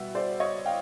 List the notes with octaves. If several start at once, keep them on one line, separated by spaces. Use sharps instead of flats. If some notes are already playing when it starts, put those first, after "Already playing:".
Already playing: B2 G3 B3 E5 F#5
C5 D5
C#5 D#5
F5 G5